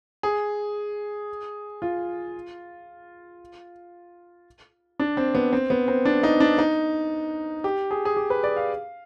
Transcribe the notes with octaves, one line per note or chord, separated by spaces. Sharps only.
G#4
F4
D4
C4
B3
C4
B3
C4
D4
D#4
D4
D#4
G4
G#4
G#4
G4
B4
D5
F5